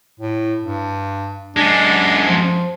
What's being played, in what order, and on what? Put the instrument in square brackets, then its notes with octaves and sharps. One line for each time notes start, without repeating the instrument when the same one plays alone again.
[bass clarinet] A2
G2
[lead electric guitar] F#2 G#3 [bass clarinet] D4
[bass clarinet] F3